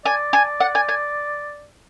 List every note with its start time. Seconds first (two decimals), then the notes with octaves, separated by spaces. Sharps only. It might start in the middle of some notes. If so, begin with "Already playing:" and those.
0.06 D5 G#5
0.33 G#5
0.60 F#5
0.75 G#5
0.89 G#5